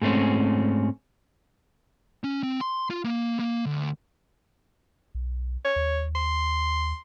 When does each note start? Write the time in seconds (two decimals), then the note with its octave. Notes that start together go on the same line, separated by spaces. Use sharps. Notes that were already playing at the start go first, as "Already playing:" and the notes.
0.02 G#2 A3 C4 C#4
2.24 C#4
2.43 C4
2.61 C6
2.90 F4
3.04 A#3
3.39 A#3
3.66 D2
5.15 B1
5.65 C#5
5.76 D#2
6.15 C6